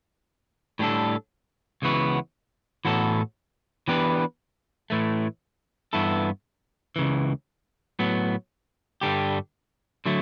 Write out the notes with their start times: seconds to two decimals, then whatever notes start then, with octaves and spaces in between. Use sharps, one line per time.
0.79 A2 G3 D4 A4
1.82 C#2 C#3 E3 B3 F#4
2.85 A2 E3 B3 F#4 A4
3.88 E3 B3 D4 G4 B4
4.90 A2 E3 A3
5.93 G2 E3 B3 E4 A4
6.96 C#2 C#3 E3
7.99 A2 F#3 B3
9.01 G2 D3 G3 D4 G4
10.06 D3 F#3 A3